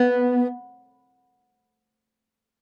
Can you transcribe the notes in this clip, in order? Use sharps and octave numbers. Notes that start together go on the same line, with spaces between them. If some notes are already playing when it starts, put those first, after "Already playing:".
Already playing: B3